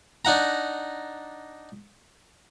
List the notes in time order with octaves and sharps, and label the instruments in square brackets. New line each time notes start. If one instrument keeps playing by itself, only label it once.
[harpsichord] D4 D#4 F#5 A#5